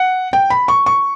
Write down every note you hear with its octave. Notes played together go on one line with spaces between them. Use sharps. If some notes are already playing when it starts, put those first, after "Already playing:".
Already playing: F#5
G5
B5
C#6
C#6